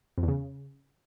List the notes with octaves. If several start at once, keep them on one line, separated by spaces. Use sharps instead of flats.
F2
E2
C#3